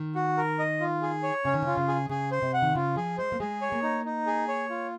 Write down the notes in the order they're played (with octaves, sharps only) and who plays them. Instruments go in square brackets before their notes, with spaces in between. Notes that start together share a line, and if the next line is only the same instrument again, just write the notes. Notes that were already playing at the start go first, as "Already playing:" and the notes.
Already playing: [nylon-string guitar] D#3
[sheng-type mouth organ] F#4
A#4
D#5
F4
G#4
C#5
[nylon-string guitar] C#3 [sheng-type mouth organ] C#4
[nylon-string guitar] D#3
[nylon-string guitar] C#3 [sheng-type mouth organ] F4
[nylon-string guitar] C#3
[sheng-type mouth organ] G#4
[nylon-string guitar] C#3 [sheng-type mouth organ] G#4
[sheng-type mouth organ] C5
[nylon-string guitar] C3
[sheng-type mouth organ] F#5
[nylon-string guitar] D#3
[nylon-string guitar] C#3 [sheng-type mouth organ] F4
[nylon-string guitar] F3 [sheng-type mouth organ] G#4
[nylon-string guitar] G#3 [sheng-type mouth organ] C5
[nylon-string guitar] A#3
[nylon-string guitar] G#3 [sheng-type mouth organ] G#4
[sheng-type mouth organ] C#5
[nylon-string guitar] A#3
[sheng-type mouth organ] D#4
D#4
G#4
C#5
F4